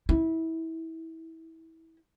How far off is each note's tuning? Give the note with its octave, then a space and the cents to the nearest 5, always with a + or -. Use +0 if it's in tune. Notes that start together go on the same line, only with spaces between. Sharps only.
E4 -25